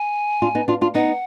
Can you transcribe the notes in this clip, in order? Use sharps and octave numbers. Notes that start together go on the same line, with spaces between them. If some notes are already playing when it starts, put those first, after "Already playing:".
Already playing: G#5
D4 F4
B3 D#4
D4 F4
D4 F4
B3 D#4 F#5